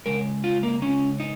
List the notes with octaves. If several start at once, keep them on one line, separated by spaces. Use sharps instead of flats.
C#3 G#3 A#4
F4
A#3
C#3 G#3 C#4
D#4